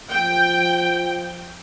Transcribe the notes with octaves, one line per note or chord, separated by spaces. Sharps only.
F3 G5